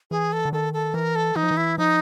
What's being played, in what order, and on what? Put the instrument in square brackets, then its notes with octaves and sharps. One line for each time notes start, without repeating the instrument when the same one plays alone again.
[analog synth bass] E3 [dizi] G#4
[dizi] A4
[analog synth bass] D3
[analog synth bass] D#3 [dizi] A4
[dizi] A4
[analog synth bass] E3 [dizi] A#4
[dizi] A4
[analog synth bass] E3 [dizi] D#4
[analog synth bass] F3
E3
[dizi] E4
[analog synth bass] F3 [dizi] D#4